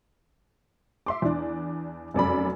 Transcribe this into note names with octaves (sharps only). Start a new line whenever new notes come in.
E5 C6 D6
E2 D4
F1 F#2 D5 B5